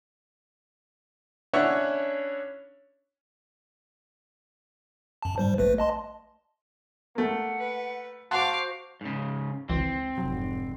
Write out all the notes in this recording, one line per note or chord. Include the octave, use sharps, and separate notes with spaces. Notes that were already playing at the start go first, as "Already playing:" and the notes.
C#4 D4 E4 C#5 E5 F#5
F#2 A5
G#2 G3 C5
A#1 A3 B4
D#5 A5 C6
A3 A#3 F#5
B4
F#4 C5 F5 F#5 A5 C6 D6
G#2 C#3
G#1 C#2 E3 C4
F1 G#2 F#3